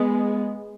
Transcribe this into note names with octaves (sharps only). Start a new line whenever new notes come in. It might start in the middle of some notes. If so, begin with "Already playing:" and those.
Already playing: G#3 B3